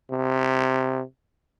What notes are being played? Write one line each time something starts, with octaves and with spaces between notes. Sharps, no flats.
C3